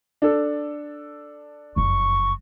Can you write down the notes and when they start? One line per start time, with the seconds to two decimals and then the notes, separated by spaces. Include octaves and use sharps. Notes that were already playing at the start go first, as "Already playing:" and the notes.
0.22 D4 A4
1.76 F#1 F2 C#6